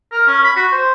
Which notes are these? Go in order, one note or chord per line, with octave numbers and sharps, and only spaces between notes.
A#4
C#4
B5
F#4
C5